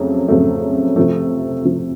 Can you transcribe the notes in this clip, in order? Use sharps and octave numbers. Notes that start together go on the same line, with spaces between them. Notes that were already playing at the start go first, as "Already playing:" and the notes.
Already playing: F2 C#3 F#3 A3
F2 C#3 F#3 A3
C3 F3 A3
C3 F3 A3